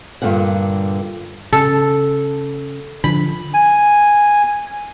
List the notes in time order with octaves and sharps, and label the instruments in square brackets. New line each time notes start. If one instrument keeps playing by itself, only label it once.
[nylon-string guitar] G2 A#2 D3 F5 F#5
[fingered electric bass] C#3 [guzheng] A4
[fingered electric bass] D3 F3 [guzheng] B5
[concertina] G#5